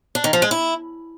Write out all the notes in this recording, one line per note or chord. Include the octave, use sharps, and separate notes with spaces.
D4
D#3
F3
G#3
E4